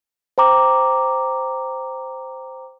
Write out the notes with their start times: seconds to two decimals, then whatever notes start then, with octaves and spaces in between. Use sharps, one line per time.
0.38 C5 G5 A#5 D6